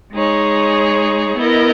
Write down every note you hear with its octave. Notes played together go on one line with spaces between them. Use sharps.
G#3 D#4 G#4 C#5
B3 E4 A#4 D#5